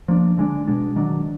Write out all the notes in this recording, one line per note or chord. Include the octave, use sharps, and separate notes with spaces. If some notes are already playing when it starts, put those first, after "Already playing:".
F3 A#3 D4
D3 G#3 D4
B2 G#3 D4
D#3 F#3 D4